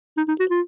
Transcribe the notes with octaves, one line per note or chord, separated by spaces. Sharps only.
D#4
D#4
F#4
F4